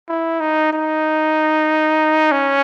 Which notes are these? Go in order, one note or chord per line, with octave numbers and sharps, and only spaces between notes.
E4
D#4
D#4
C#4